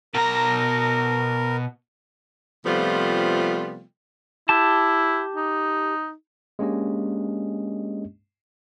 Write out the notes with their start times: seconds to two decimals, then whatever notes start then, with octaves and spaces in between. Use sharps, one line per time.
0.14 B2 A#4 A#5
2.66 C3 F3 G3 A3 B3 F4
4.49 E4 G4 A5
5.36 D#4
6.59 G#3 A#3 C#4 D4 G4 D#5